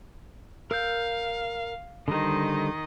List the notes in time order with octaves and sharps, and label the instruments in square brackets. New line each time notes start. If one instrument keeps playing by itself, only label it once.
[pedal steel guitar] A#4 E6 G6 [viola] F5
[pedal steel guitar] D3 G3 C5 [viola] D#3 D#5